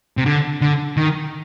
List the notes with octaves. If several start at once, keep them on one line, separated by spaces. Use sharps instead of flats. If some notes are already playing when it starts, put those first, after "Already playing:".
C3
D3
D3
D#3